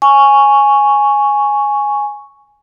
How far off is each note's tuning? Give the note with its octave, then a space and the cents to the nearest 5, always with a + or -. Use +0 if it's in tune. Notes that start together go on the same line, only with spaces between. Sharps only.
G#5 +0 C#6 +0